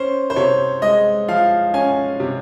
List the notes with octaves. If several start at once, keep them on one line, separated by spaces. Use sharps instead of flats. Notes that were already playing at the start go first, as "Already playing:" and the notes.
Already playing: C#4 C5
C5
C3 C#5
G#3 D#5
F3 F5
C#4 G#5
C3